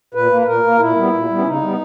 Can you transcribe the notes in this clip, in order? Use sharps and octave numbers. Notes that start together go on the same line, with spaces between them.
A#2 B4
A#3
B4
A#2 A#4
A#3
A#2 E4
G3 B3
A#2
G3 B3
C#4
C#3 D#4
G3 B3